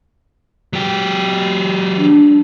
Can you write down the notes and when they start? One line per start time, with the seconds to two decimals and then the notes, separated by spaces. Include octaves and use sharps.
0.73 F#3 G4
1.98 D4